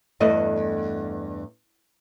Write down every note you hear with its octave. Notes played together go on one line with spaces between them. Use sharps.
E2 G2 A3 D#5